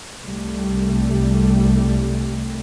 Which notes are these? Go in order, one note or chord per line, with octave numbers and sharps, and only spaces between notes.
C2 G3 A3